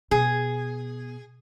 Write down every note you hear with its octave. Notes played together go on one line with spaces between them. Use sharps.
B2 G#4